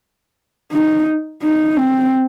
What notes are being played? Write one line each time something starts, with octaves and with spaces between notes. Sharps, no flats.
D#4
D#4
C4